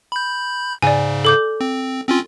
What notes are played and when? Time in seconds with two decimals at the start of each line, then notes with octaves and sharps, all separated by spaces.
0.12 B5 G6
0.82 G#2 C#3 D5 G#5
1.25 A4 D6 G6
1.61 C4
2.08 C4 C#4 F4